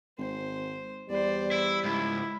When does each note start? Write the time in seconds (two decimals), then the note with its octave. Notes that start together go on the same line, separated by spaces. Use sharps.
0.18 G#1 C5
1.10 E2 G3 C5 D5
1.51 E4
1.84 C#2 G#2 E4